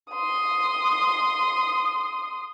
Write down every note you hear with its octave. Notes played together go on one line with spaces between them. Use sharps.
C6 D#6